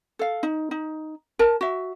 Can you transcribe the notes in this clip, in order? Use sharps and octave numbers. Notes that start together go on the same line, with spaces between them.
A4 F5
D#4
D#4
A#4 A5
F#4 E5